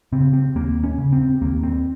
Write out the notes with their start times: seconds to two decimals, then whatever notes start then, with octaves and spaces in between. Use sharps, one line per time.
0.13 C#3 C4
0.33 C4
0.55 D#2 A#3
0.84 C#4
0.98 C#3
1.13 C4
1.42 D#2 A#3
1.63 C4